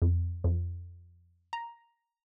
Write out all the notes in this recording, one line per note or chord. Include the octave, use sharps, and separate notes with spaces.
F2
F2
A#5